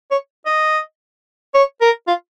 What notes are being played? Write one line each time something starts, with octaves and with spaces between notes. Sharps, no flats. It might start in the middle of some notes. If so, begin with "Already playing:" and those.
C#5
D#5
C#5
A#4
F4